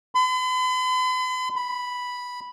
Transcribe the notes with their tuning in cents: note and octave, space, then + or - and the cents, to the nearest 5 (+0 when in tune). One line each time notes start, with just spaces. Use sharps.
B5 +45
B5 -5